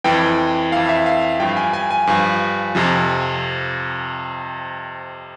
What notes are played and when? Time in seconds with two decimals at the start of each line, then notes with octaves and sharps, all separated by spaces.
0.04 F2 E3 G5
0.72 F2 E3 F5
0.89 E5
1.06 F5
1.40 G2 F3 G5
1.57 G#5
1.73 G#5
1.91 G#5
2.07 G2 F3
2.75 F2 C3 F3